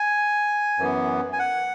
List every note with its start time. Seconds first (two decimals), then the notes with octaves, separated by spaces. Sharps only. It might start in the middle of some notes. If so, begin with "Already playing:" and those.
Already playing: G#5
0.79 F#2 E3 B3
1.33 G#5
1.39 F#5